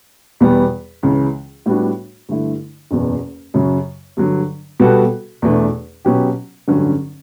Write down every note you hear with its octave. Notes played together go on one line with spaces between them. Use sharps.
E2 B2 G3 B3
C#2 C#3 E3
A2 G3 B3 D4 F#4
G2 D3 A3 E4
F#1 E2 B2
F#2 C#3 F#3
G2 D3 F#3
B2 G3 B3 F#4 A4
E2 B2 A3 D4
B2 F#3 C#4 G4
A1 G2 D3 F#3 C#4